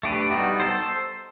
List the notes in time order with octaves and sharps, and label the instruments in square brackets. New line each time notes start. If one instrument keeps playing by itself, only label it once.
[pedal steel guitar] A3 D4 G4 B4
G3 B3 D#4 F#4
A4 C5